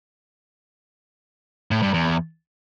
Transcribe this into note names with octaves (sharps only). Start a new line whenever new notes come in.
A2
G2
E2